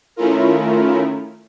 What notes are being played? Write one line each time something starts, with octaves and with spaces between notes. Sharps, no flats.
D#3 A3 C#4 E4 F4 A#4